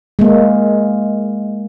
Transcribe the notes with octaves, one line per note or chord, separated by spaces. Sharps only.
G#3 A#3